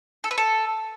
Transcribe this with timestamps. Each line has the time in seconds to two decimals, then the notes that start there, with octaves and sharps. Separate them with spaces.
0.24 A4
0.31 B4
0.38 A4